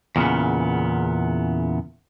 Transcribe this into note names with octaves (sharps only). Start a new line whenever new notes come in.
E2 A#2 C#3 B3